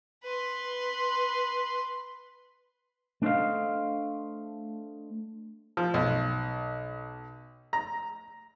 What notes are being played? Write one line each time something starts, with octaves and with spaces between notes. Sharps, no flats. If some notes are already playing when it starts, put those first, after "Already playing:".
B4 C6
A3 D4 A4 C5 D#5 F5
F3
B1
A#5